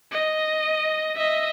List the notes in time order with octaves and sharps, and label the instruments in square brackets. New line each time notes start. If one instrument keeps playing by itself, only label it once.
[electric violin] D#5
D#5 E5